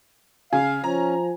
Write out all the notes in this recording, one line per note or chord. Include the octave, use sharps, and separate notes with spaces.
C#3 F5 G#5
F3 C#4 A#5